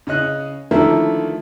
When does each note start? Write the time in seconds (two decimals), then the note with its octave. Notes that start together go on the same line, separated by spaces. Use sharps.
0.07 C#3 C#4 D#5 F#6
0.71 D3 D#3 F3 A3 A#3 E4